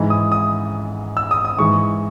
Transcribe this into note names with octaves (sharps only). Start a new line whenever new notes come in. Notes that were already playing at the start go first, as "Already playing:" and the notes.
Already playing: G#2 E3
D#6
D#6
E6
D#6
D#6
G#2 E3 C#6